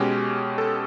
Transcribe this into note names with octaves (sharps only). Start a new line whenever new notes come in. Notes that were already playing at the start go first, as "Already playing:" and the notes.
Already playing: B2 G#3 C#4 G4
A4